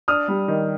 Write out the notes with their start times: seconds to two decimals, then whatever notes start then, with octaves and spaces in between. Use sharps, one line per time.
0.08 D4 D#6 F6
0.28 G3
0.48 D#3